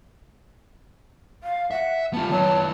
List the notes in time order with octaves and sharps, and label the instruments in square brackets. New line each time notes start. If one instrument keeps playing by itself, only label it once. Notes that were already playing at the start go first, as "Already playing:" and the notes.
[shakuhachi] F5
[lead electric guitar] E5 [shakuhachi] F#5
[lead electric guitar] B3 F4 [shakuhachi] A5
[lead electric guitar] D#3 B3 [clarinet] F#3 [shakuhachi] A5